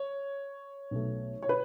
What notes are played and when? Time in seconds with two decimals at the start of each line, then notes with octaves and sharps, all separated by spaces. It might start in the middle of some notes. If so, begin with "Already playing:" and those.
Already playing: C#5
0.91 B1 B2 A3
1.42 C#5
1.49 B4